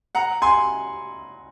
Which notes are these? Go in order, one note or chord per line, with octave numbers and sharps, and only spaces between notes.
F#5 A#5
G#5 C6